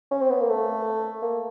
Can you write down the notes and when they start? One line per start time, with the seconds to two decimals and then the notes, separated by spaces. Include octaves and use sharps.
0.11 C#4
0.21 C4
0.30 B3
0.40 A#3
0.50 A3
1.22 A#3